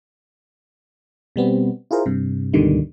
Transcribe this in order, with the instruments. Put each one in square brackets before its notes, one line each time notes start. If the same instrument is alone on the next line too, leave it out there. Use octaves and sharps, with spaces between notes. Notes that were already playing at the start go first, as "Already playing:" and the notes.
[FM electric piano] B2 G3 B3 C4
E4 F4 G#4 A#4 C5
G2 C3
D2 G#2 B2 D3 D#3 G3